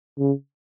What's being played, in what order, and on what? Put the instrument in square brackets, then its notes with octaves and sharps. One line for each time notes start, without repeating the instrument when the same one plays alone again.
[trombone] C#3